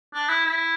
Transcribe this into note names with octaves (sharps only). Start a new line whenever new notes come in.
D4
E4
E4